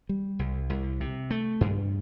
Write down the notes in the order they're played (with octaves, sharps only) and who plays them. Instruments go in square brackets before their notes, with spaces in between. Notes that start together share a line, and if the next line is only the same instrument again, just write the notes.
[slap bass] G3
C2
C2
C3
A3
G2